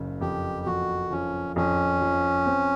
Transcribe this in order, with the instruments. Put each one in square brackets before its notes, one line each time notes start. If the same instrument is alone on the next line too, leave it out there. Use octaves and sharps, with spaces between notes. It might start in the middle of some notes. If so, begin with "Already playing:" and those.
Already playing: [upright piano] F#1 C#3
[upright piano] F2 [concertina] G4
[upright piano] F2 [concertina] F#4
[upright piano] F3 [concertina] C#4
[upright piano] F2 [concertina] C#4
[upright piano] F3
C4